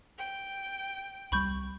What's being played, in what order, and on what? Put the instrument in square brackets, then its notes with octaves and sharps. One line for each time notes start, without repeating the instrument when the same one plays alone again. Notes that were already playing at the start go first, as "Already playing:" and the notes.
[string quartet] G5
[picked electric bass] C2 G3 [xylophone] B5 C#6 G6